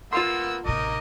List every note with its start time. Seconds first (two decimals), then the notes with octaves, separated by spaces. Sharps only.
0.13 A#3 B3 F4 F5 F#5 C6 E6
0.66 A1 C3 D#4 A#4 D#5 D6